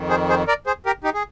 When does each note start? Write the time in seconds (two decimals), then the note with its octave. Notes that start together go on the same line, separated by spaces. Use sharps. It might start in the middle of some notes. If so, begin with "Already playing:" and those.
Already playing: F2 D#3
0.09 G#4 C5
0.29 G#4 C5
0.47 A#4 D5
0.66 G#4 C5
0.86 G4 A#4
1.04 D#4 G4
1.14 G#4